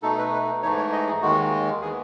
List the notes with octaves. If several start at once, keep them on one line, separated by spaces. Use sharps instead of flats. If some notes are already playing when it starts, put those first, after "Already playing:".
B2 A3 D#4 A4
B4
B4
G#2 E3 A3 D#4 C#5
C#5
D#5
G#4
D#2 D#3 G#3 F#4
E3 B3 G#4